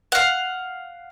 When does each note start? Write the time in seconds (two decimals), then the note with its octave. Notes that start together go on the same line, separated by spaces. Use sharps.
0.12 F5 F#5